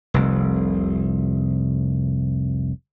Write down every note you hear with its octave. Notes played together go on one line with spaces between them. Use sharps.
F1 C2